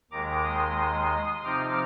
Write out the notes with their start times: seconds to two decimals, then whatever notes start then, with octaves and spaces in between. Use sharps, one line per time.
0.11 D#2 D#3 G#3 A#5 D6
0.44 C6 D#6
1.43 C3 F3 C4 D#4 D6 F6